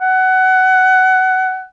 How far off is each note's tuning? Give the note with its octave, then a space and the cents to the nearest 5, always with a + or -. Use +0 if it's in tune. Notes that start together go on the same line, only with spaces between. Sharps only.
F#5 +20